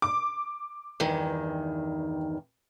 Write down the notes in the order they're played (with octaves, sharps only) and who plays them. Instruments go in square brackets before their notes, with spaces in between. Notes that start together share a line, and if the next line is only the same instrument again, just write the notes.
[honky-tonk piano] D6
[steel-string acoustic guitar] E2 G2 D#3